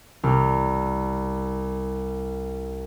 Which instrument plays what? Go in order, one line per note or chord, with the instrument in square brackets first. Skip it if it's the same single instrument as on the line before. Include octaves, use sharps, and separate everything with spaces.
[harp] C2 F6